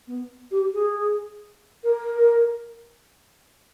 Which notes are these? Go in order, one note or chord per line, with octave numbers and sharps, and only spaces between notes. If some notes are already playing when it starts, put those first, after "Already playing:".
B3
G4
G#4
A#4